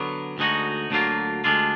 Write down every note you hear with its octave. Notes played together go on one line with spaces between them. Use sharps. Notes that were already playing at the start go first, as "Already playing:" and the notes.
Already playing: D3 F#3 B3
D2 D3 G#3 D#4 F#4
D2 D3 F#3 A#3 F4
D2 D3 G#3 D4 F4